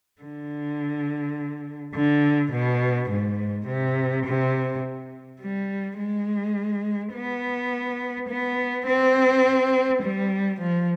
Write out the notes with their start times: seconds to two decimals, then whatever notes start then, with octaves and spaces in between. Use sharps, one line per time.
0.22 D3
1.95 D3
2.52 B2
3.10 G#2
3.67 C3
4.26 C3
5.41 G3
5.98 G#3
7.14 B3
8.29 B3
8.87 C4
10.03 G3
10.60 F3